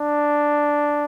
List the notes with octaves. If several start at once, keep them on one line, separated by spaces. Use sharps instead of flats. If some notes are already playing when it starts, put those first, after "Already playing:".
Already playing: D4